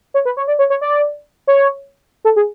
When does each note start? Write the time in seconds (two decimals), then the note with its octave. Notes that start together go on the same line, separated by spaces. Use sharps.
0.14 C#5
0.25 B4
0.37 C#5
0.48 D5
0.59 C#5
0.70 C#5
0.81 D5
1.47 C#5
2.25 A4
2.36 G#4